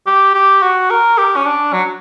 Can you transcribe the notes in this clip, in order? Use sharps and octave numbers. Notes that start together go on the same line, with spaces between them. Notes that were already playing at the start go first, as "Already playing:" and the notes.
G4
G4
F#4
A#4
G4
C#4
D4
F#3